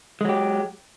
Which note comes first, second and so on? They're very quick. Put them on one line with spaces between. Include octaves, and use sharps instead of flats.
G#3 F#3 G4